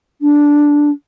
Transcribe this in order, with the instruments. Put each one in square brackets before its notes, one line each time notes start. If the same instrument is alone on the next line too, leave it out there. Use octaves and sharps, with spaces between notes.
[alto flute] D4